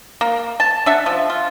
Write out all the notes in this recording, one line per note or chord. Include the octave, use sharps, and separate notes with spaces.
A#3
A5
D4 E5 F#5
F3
F4